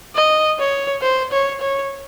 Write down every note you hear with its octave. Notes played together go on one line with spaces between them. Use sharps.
D#5
C#5
C5
C#5
C#5